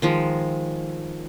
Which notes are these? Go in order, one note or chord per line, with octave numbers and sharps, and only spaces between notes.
D#3 F3 G#3